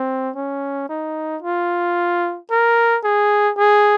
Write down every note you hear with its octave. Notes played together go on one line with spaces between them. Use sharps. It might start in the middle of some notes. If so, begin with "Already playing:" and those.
Already playing: C4
C#4
D#4
F4
A#4
G#4
G#4